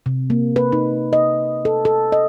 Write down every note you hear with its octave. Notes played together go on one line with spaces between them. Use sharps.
C3
A#3
B4
D#4
D#5
A4
A4
D#5